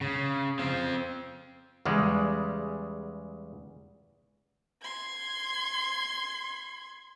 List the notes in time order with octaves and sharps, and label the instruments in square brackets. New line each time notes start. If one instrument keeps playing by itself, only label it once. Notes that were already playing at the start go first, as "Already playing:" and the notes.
[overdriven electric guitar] C#3
C4 F5
[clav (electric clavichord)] E2 C#3 G3 G#3
[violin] C6 G#6